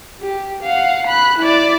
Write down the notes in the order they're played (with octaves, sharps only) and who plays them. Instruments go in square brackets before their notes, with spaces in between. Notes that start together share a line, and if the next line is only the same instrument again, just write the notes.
[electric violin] G4
F5 F#5
B5 F#6
E4 D5